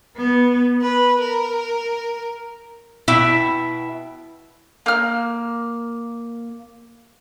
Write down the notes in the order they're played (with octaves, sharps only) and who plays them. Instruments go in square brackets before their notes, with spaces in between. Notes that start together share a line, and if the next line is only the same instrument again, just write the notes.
[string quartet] B3
B4
A#4
[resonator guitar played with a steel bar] B2 E4 E5 G5
[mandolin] A#3 F6